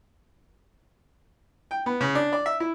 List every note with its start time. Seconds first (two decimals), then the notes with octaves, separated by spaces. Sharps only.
1.71 G5
1.86 B3
2.01 C#3
2.15 D4
2.33 D5
2.46 E5
2.60 E4